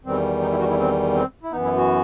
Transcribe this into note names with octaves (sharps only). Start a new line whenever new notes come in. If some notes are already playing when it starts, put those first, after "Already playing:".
E2 D#3 G3 C4
D#4
E4
F#4
E4
C4
C4
E4
F#2 E3 B3 D#4
E4
F#4